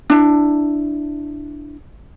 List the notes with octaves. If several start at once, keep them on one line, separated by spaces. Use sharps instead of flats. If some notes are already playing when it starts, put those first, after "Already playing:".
D4 E4